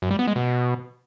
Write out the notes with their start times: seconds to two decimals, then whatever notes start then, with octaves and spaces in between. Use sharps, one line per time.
0.02 F#2
0.11 G3
0.19 B3
0.27 G#3
0.36 B2